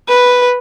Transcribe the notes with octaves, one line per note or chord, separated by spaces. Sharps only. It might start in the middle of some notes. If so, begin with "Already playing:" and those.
B4